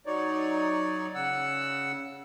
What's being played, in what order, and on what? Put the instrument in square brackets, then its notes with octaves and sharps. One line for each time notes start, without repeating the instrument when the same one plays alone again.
[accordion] F#3 D#4 C#5 D5
C#3 F#5 E6